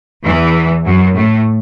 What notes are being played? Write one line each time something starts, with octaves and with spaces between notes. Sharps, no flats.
E2 E3
F#2 F#3
A2 A3